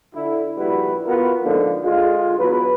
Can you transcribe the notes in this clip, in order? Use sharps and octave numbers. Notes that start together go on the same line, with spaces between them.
D3 E4
A#1 G3 E4 F#4 B4
E3 B3 F4 F#4 A#4
G#2 D3 F3 A#3
D3 G#3 F4
E2 F#3 B4